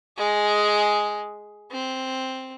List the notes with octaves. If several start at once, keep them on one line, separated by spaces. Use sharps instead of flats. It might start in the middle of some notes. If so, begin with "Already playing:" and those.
G#3 G#4
C4